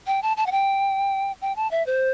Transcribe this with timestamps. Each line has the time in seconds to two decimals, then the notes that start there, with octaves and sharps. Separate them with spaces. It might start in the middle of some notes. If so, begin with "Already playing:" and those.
0.07 G5
0.23 A5
0.37 A5
0.47 F#5
0.52 G5
1.41 G5
1.56 A5
1.71 E5
1.86 C5